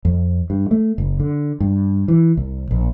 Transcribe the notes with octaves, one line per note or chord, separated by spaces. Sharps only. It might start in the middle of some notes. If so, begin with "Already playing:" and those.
F2
G2
A3
F#1
D3
G2
E3
C2
A#1